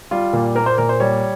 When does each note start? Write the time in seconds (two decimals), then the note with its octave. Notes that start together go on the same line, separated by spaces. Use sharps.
0.11 G3 F4
0.33 A#2
0.55 A#3 A#4
0.66 C5
0.78 A#2 A#4
0.89 C5
1.00 G3 C#5